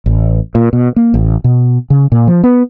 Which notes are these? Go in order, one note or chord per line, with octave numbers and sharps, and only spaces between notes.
A1
A#2
B2
A#3
A1
B2
C#3
A#2
F3
B3